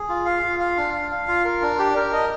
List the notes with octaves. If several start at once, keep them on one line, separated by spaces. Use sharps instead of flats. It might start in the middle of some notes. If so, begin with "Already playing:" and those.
Already playing: G#4
F4
F5
F4
F5
D4
F5
F5
F4
A#4
D4
G4
A#4
D#5